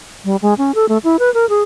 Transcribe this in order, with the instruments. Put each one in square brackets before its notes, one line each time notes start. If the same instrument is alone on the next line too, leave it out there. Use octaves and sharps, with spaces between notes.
[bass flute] G3
G#3
C#4
A4
A3
E4
B4
A#4
G#4